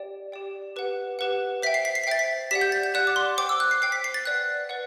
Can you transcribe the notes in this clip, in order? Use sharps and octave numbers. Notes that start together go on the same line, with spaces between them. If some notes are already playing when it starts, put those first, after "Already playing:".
Already playing: G4 D5 G5
G4 D5 G5
G4 B4 F#5
G4 B4 F#5
C5 E5 G5 B6
C7
B6
C7
B6
C5 E5 G5 A6
B6
G4 D5 F#5 B6
G6
A6
G6
G4 D5 F#5 F#6
D6
C6
C5 G5 D6
E6
F#6
C7
C5 G5 C7
B6
C7
A6
B4 D5 F#5 F#6
B4 D5 F#5